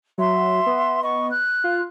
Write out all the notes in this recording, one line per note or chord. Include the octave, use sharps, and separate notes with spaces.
F#3 E5 C6
B3
D#5 C#6
F#6
F4